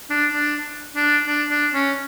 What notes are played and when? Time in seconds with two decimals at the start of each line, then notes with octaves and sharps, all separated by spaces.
0.10 D4
0.34 D4
0.96 D4
1.27 D4
1.50 D4
1.74 C#4